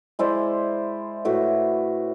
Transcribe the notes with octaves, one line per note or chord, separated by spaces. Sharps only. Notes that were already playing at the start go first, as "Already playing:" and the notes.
G#3 E4 C5 D5
A2 F#4 B4 E5